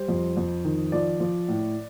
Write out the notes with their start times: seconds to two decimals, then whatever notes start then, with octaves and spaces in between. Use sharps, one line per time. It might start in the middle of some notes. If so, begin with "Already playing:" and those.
Already playing: G3 C5
0.08 F2
0.37 F2
0.65 D#3
0.92 F3 D5
1.20 F3
1.48 A2